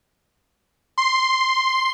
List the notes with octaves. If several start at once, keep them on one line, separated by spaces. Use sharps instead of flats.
C6